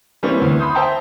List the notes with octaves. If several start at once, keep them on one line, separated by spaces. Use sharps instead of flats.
E3 G3 A#3 C4 C#4
D2 E3
B5 C6 D#6 G6
C5 E5 G5 A5 A#5